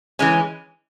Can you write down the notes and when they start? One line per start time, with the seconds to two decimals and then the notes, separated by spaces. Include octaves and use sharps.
0.19 E3 G#3 C#4